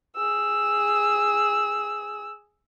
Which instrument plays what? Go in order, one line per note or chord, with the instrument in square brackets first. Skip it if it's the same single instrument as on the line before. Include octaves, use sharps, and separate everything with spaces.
[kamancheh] G#4 E6